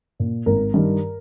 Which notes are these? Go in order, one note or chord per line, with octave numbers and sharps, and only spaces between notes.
A#2
G#1 A#4
G2 D#3